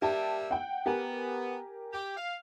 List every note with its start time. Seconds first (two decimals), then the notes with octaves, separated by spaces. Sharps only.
0.02 G3 A#3 G4 E5 A5
0.51 F#5 G5
0.86 B3 G4 A#4 G#5
1.93 G4
2.17 F5